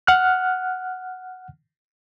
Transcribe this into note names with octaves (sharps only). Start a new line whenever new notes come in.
F#5 F6 F#6